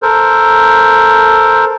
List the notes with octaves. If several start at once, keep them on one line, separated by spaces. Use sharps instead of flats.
A4 A#4 C5